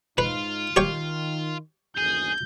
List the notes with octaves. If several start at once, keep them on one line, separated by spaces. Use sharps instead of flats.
G#2 D#4 F4 B4
D#3 G4 C#5 G5
F#1 D2 D#3 G#4 G6